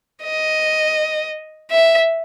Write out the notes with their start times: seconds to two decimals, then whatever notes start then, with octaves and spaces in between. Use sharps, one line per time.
0.23 D#5
1.71 E5